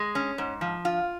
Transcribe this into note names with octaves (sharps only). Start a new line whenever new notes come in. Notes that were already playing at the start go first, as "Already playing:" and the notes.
Already playing: G#3
C#4
G#2
F3
F4